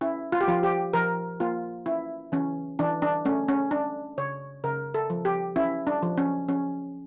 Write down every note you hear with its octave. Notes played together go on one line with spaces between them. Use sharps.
C#4 E4
F4
G4
F3 F4
G4
F3 A#4
A#3 F4
C#4 E4
E3 C#4
E3 D4
D4
A3 C#4
C#4
C#4 D4
C#3 C#5
C#3 A#4
A4
F3
G4
C#4 E4
D4
F3
C#4
F3 C#4